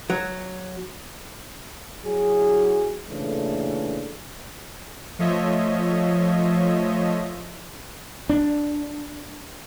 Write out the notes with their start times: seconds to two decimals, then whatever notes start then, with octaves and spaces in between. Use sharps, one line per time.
0.10 F#3
2.05 F#3 E4 F#4 G#4
3.10 A#2 C#3 E3 A3 D4 A4
5.19 F3 A3 F4 C#5 D#5 E5
8.29 D4